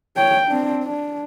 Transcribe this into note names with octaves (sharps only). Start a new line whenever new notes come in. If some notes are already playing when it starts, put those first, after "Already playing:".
C#5 G5
C4 D4
D4